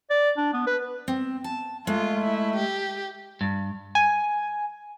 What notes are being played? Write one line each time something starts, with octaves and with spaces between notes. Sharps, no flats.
D5
D4
B3
B4
C4
A5
G#3 A3 F4
E4
G4
G2
G#5